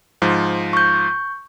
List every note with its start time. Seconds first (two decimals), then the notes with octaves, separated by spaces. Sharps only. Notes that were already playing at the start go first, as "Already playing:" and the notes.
0.22 G#2 F3
0.73 C#6 G6